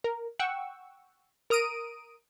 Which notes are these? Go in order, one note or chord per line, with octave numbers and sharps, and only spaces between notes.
A#4
F#5 G5 C#6 E6
A#4 A#5 D#6 D7 D#7